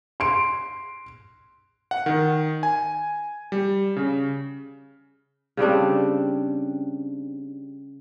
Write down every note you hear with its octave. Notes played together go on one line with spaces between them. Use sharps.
C6 D7
F#5
D#3
G#5
G3
C#3
C#3 G3 C4 D4